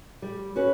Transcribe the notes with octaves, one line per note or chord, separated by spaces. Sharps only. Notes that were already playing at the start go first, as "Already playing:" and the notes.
G3
C#4 F#4 B4